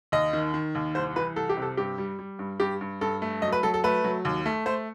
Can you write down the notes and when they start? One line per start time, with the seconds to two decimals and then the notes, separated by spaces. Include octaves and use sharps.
0.12 D#2 D#5
0.33 D#3
0.54 D#3
0.75 D#2
0.95 C2 C5
1.16 E3 B4
1.36 C2 A4
1.49 G4
1.57 C3 A4
1.77 G2 G4
1.98 G3
2.19 G3
2.39 G2
2.60 G2 G4
2.81 G2
3.01 G2 A4
3.22 A3
3.42 F#3 D#5
3.53 B4
3.63 F#3 A4
3.74 A4
3.84 A3 B4
4.04 F#3
4.25 D#2
4.46 A3
4.66 A3 C5